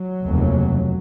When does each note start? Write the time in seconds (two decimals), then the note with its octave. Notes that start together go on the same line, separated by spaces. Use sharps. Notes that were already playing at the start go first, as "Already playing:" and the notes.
Already playing: F#3
0.23 F1 D#2 C#3